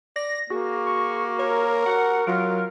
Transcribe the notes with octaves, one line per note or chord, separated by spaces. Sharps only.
D5 A#6
A#3 F#4 G#4
C#6
A#4 C#5
F#4 F#5
F#3 F4 A#4